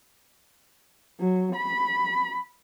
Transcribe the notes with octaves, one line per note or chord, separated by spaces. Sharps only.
F#3
B5